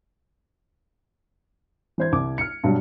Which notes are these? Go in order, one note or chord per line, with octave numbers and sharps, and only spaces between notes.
E3 C5 G#6
C2 D6
F6 C#7
G2 B2 F#3 G3